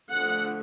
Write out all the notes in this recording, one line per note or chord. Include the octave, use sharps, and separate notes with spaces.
D3 F3 A3 F#5